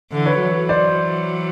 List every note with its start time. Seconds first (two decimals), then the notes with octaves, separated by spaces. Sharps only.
0.11 D3 E3
0.26 B4 C#5
0.40 E3 F#3
0.69 C5 D5